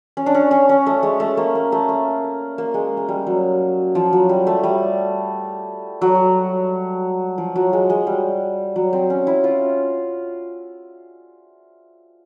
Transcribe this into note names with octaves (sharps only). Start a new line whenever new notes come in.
C#4
D4
C#4
C#4
C#4
A3
G#3
A3
A#3
A#3
A3
A#3
A#3
G#3
G#3
G3
F#3
F3
F#3
G3
A3
G3
F#3
F3
F#3
G#3
G#3
G3
F#3
C4
C#4
E4
F4